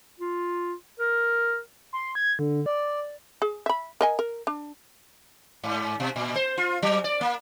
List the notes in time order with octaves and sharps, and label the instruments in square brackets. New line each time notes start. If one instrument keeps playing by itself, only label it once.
[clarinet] F4
A#4
[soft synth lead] C6
G#6
D3
D5
[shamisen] G#4
E5 B5
A#4 D#5 G#5
A#4
D4
[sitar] G#2
B2
A#2
C5
F4
F#3
D5
A#3